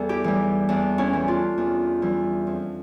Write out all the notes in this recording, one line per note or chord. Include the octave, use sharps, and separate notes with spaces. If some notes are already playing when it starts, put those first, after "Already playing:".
Already playing: E2 G3 A4
E4 G4
E3 G3
E2 D4
C#4 E4
E3 G3
D4 F4
E2
E3 G3
F2